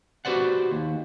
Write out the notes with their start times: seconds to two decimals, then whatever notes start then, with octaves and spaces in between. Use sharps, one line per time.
0.25 F#4 G4 B4 C5 D5 F#5
0.71 D#2